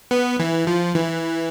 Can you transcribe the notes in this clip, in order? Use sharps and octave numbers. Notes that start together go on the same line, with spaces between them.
B3
E3
F3
E3